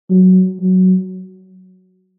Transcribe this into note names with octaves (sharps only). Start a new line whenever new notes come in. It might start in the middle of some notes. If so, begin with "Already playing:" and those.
F#3
F#3